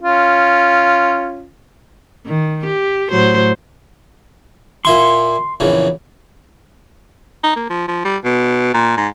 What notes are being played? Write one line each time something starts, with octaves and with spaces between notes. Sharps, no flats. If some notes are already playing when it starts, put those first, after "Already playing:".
C#4 F4
D#3
G4
A2 F#3 C5
A#2 E4 C6 C#6
A#1 E2 C#3
D#4
A#3
F3
F3
G3
B2
A#2
G#2